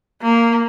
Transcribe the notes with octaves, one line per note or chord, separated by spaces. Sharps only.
A#3